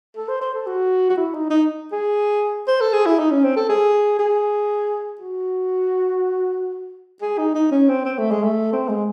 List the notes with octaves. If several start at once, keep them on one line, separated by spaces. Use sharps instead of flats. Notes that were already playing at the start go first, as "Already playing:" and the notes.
A4
C5
C5
A4
F#4
F#4
E4
D#4
D#4
G#4
C5
A4
G#4
E4
D#4
C#4
C4
A4
G#4
G#4
F#4
G#4
D#4
D#4
C#4
C4
C4
A3
G#3
A3
C4
G#3